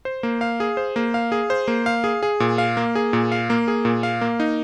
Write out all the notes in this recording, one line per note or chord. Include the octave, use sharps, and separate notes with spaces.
C5
A#3
F5
G#4
C5
A#3
F5
G#4
C5
A#3
F5
G#4
G#4
A#2
F5
A#3
G#4
A#2
F5
A#3
G#4
A#2
F5
A#3
D#4